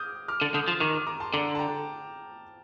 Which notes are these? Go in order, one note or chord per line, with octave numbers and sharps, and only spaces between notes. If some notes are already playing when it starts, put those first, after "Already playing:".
Already playing: D6 D#6 F6 G6
D6 F6
D3
D3 D#6 G6
F3
D#3 D6 F6
D6 F6
A#5 D6
A5 C6
D3 A#5 D6
A5
G5 A#5